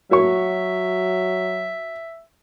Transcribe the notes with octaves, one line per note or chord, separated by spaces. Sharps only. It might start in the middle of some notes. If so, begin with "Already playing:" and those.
F#3 F#4 C#5 E5 C#6